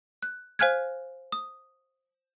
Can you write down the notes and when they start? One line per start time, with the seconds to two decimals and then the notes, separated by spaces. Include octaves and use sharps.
0.23 F#6
0.59 C5 F5 G#5 F6 F#6 G#6
1.32 D#6